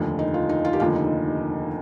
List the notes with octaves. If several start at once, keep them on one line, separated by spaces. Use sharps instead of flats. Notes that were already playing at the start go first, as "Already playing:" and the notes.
Already playing: F1 D#2 D3 F3
D#4
F4
D#4
F4
G4
F1 D#2 D3 F3 F4
D#4